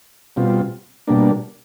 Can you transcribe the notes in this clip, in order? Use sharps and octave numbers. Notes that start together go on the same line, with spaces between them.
B2 G3 C4 F4
B2 G3 A#3 D4